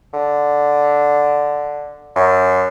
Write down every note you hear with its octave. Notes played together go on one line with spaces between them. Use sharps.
D3
F#2